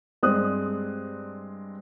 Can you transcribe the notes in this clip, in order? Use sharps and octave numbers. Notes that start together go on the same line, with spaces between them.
G2 G#3 C4 D5 D#6 F#6